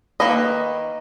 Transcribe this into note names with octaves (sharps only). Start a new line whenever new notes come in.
D#3 A#3 B4 D#5